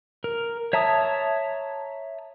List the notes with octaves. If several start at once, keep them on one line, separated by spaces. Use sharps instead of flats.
A#4
C#5 E5 A5 A#5 D#6